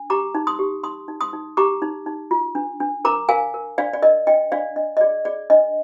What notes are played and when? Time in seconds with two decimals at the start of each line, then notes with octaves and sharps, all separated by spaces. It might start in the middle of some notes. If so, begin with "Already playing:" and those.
Already playing: D4
0.10 G4 A#5 D6
0.35 D#4
0.47 C6 D#6
0.59 G4
0.83 D#4 C6 D#6
1.08 D#4
1.21 C6 D#6
1.33 D#4
1.57 G4 A#5 D6
1.82 D#4
2.06 D#4
2.31 F4
2.55 D4
2.80 D4
3.05 A#4 A#5 D6
3.29 A#4 F5 G#5
3.54 A#4
3.78 D4 D5 F5
3.93 D5
4.02 A#4 D#5
4.27 D4 D#5 G5
4.52 D4 D5 F5
4.76 D4 D#5
4.97 D#5
5.01 G#4 D5
5.25 G#4 D5
5.50 D4 D#5